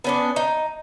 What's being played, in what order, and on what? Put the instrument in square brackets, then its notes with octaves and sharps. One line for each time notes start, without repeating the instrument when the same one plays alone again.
[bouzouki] B3 C#4 D4
D#4